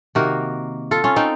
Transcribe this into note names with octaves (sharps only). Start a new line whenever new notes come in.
C3 D#3 A#3 F#4 A#4
F4 A4
C#4 F4
C4 D#4